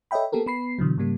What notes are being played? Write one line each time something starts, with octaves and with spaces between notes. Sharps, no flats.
A4 C#5 D#5 E5 G5 B5
A#3 B3 G4 A4 A#4
B3 B5 C7
B2 D3 E3 F#3
G#2 C#3 G3 A#3